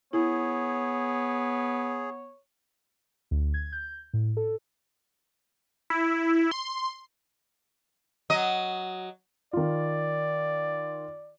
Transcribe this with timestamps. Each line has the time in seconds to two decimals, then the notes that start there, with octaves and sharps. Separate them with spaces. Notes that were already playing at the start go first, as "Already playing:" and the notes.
0.13 B3 E4 G#4 C#5
3.31 D2
3.54 G#6
3.72 G6
4.14 A2
4.37 A4
5.90 E4
6.51 C6
8.30 F#3 D#5
9.53 D#3 F4 D5